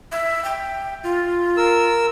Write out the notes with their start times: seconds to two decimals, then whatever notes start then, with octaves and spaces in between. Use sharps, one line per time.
0.12 E5
0.44 G5
1.03 F4
1.57 A#4 E6